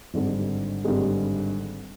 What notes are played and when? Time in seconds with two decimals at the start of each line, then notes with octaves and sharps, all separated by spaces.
0.14 G#1 G2 D3 G#3
0.85 G#1 G2 D3 G#3